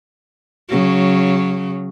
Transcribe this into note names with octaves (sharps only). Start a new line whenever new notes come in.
C#3 F#3